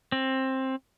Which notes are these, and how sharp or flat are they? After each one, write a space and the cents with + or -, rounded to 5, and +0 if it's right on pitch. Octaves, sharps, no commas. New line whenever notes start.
C4 +15